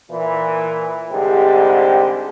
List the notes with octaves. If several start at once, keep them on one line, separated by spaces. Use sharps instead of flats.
A#2 E3
C2 G#2 D3 C4 G4